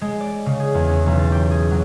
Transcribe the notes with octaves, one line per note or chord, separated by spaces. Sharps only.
G#3
D5
C#3
G#4
E2
C#4
B1
A6
G4
G#4
F#3